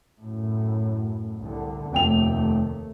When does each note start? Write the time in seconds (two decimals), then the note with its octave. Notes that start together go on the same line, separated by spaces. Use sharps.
0.22 F#2 A2
1.40 C2 D3
1.93 F1 D#2 A3 G5 F7